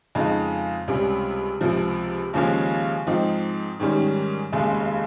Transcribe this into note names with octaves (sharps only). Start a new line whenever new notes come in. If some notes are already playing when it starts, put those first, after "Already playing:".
F2 C#3 G#3 D#4
C#2 C3 G3 C#4
C#2 C3 F3
D#2 C#3 F3 G#3 C#4
G#2 F3 C4 D#4
G#2 D#3 G3 C#4
F1 D#2 C#3 G#3